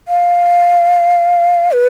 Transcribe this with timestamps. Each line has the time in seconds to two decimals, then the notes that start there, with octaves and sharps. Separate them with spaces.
0.08 F5
1.72 B4